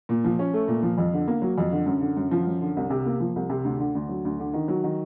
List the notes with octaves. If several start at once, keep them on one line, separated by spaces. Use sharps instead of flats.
A#2
F3
C#4
A3
A#2
F3
F2
D3
A#3
F#3
F2
D3
F#2
D3
F#2
F3
F#2
D3
C2
C3
A#3
F3
C2
C3
D2
D3
D2
F#3
D2
D3
D#3
F#3
D#3